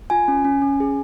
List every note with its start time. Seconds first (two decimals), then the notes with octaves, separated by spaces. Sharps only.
0.10 F4 G#5
0.28 C#4
0.45 C#4
0.62 C#4
0.80 G#4